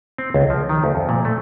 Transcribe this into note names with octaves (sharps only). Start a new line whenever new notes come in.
C4
C#2
F3
D#3
D2
F2
A#2
A3